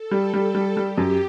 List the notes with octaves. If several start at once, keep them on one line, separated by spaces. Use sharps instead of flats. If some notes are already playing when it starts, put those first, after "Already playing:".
Already playing: A4
G3
G3 A4
G3
G3 G4
F#2